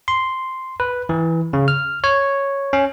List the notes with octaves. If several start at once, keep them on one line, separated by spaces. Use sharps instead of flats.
C6
B4
E3
C#3
F6
C#5
C#4